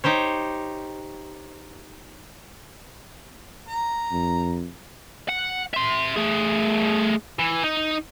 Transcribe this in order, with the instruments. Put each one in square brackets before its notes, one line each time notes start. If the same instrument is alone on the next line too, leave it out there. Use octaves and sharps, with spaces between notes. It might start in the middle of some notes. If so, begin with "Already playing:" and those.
[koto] D#4 G4 C5 C#5
[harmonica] A#5
[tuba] F2
[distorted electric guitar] F#5
E5 C6
A3 G#4
E3
D#4